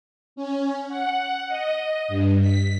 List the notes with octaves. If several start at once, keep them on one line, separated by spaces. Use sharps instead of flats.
C#4
F#5
D#5
G2
B6